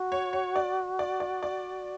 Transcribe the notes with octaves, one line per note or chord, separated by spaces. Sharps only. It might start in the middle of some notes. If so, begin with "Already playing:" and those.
Already playing: F#4
C#5
C#5
D5
D5
D5
D5